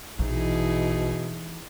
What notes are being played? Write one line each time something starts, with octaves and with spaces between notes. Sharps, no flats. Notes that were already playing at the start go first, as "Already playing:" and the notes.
A#1 B2 E3 D#4 E4 G#4